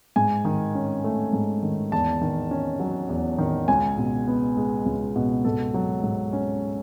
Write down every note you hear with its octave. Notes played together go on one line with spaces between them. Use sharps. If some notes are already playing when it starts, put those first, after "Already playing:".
G#2 G#5
D#3
C#4
A3
G#2
D#3
E2 A5
D#3
C#4
F#3
E2
D#3
C#2 G#5
B2
B3
G#3
C#2
B2
G#2 A4
F#3
G#2
C#4